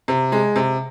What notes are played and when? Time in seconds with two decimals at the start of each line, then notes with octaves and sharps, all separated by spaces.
0.08 C3
0.32 G#3
0.56 C3